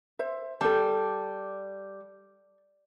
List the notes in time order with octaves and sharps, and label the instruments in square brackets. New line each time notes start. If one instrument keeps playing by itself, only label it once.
[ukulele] C5 E5
[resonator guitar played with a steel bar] G3 [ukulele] A4 A5